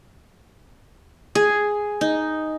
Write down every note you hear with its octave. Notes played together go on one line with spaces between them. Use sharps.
G#4
D#4